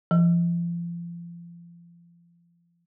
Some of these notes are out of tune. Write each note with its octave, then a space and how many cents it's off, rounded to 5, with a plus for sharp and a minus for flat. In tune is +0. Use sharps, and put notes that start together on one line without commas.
F3 -35